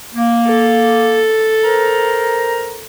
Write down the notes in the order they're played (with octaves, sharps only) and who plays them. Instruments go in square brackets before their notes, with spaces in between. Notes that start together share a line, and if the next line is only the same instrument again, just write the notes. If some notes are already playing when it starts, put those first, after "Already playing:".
[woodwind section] A#3
[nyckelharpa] A4
[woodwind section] A#4 C5 A#5